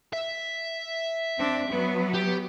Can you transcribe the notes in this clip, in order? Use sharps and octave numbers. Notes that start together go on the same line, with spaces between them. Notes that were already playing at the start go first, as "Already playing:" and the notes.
E5
C4 D4
F#3 B3
G4